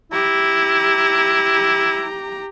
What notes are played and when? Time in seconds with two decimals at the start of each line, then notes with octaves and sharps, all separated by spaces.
0.12 E4 G4 A#5